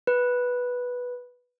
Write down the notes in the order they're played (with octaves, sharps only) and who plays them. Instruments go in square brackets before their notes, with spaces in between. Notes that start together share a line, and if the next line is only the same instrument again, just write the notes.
[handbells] B4